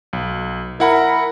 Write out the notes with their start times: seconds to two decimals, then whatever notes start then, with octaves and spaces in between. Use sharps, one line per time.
0.13 B1
0.80 E4 A#4 F#5 B5